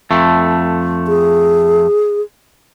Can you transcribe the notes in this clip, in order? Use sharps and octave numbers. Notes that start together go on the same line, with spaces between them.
F2 A3
G#4